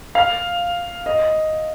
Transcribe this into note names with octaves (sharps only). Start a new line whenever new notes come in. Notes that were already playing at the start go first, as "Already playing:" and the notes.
F5
D#5